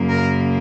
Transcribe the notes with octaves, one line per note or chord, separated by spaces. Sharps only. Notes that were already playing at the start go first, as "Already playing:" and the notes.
Already playing: F#2 C#3 A#3
A#4